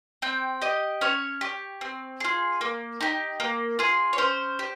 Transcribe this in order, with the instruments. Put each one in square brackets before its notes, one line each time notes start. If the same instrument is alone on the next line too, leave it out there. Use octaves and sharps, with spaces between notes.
[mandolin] C4 G5
G4 D#5
C#4 C#5
G4
C4
F4 G#4
A#3
D#4 G4
A#3
F4 G#4
C#5
C#4 C5
G4